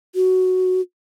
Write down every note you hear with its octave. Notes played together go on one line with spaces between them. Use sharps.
F#4